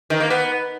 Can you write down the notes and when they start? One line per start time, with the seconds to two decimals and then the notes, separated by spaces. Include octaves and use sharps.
0.10 D#3
0.20 A#3
0.30 B3